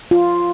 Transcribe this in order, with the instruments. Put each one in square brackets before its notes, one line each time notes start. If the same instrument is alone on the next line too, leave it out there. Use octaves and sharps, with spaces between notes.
[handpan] F4